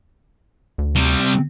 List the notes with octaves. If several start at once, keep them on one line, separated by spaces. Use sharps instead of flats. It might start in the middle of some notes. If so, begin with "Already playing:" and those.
D2
C3 G3
C4